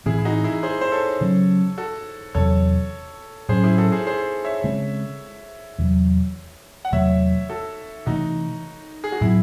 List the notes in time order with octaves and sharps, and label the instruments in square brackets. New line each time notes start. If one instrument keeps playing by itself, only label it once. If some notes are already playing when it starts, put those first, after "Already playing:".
[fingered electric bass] A2 E3 C4 [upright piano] E4 G#4
[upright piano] E4
D#4 F#4
E4 G#4
G#4 C5
C5
A4 C#5
[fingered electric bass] C#3 F#3 C#4
[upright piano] F#4 A4
[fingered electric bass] E2 C3 F#3 [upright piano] A4 C#5
[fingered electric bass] A2 F#3 C#4 [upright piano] G#4 C5
[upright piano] E4 G#4
F#4 A4
G#4 C5
G#4 C5
C#5 E5
[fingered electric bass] C#3 G#3 C4
E2 C3 F#3
[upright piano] F#5
[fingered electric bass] E2 C3 F#3 A3 [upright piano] C#5 E5
[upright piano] F#4 A4
[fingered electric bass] C3 E3 A3 [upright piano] D#4 F#4
[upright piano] G#4
F#4
[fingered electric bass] A2 F#3 C4 [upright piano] E4